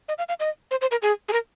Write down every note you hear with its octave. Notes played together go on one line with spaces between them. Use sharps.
D#5
F5
F5
D#5
C5
C5
A#4
G#4
G#4
A#4